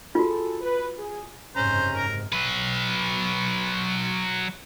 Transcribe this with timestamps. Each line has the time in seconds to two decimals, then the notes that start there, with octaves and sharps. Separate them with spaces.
0.15 F4 F#4 G#4 A4
0.61 B4
0.98 G#4
1.56 F#1 G#2 C3 C#4 C5 A#5
1.96 A#4
2.33 F#3 B4